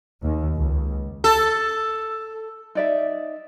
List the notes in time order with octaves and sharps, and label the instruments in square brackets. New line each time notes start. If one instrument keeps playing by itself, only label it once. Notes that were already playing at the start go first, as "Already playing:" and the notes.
[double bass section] D#2
C#2
[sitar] A4
[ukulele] D#4 D5 E5